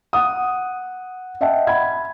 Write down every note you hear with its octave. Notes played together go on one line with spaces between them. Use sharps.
F#5 D#6
D#5 E5 F#5 G5 A5
B5 G#6